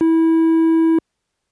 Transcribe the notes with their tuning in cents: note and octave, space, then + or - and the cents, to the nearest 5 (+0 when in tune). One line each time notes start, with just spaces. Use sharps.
E4 -20